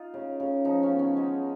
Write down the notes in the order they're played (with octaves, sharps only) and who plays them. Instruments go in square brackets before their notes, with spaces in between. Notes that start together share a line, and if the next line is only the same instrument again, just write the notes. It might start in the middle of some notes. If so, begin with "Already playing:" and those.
Already playing: [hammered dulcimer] D#4 F4
C#3
C#3
F3 D#4
C#4
B3
C#4
G#3 D#4